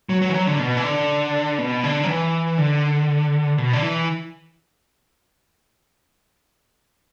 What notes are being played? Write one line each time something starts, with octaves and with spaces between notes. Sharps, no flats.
F#3
F#3
E3
F#3
D3
B2
E3
D3
B2
D3
F#3
E3
D3
B2
D3
E3